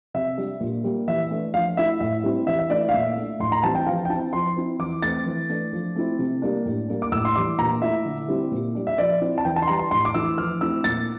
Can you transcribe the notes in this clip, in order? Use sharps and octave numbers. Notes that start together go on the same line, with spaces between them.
C3 E5
G3 D4
A#2
G3 A#3
E3 E5
A3 D4
F3 F5
A3 E4 E5
A2 E5
G3 C4 E4
E3 E5
E5
A3 E4 D5
F5
A#2 E5
A3 D4
A2 C6
A#5
E3 G3 C4 E4 A5
G5
F3 F5
G5
C4 E4 A5
F3 C6
C4 E4
E3 D6
A3 C4 A6
E3
A3 D4
F3
A3 C4 E4
C3
G3 A#3 D4
A2
G3 A#3 D4
D6
A2 E6
C6
E3 G3 D4 D6
A#2 A#5
A3 E4 E5
D3
G3 C4 E4
A#2
G3 D4
E5
F3 D5
C4 E4
A5
E3 G5
A5
C6
G3 D4 A#5
C6
A2 C6
D6
E3 A3 E4 E6
F3 F6
A3 C4 E4 E6
A#2 A6